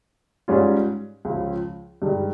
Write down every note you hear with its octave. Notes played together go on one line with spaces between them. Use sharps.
G#2 G3 C#4 F4
C#2 C#3 F3
G2 D#3 G#3 D#4